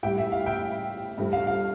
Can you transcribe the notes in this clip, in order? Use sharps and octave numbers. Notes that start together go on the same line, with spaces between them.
A2 G3 E5 G5
E5
F5
E5 G5
G2 F3 A3
F5
F5